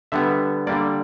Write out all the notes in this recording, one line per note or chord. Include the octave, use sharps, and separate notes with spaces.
D3 G3 B3 E5
D3 G3 A#3 D5